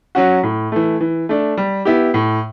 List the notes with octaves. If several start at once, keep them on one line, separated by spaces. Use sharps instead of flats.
F#3 C#4 F#4
A2
E3 A3
E3
A3 D4
G3
B3 E4 G4
A2